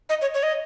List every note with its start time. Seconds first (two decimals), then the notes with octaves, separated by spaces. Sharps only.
0.09 D#5
0.21 C#5
0.34 C#5
0.43 D#5